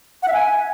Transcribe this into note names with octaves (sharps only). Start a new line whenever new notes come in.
F#5
E5
G#5